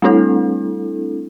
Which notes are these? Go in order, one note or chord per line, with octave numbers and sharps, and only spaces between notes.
G3 A3 C4 D4 E4 A4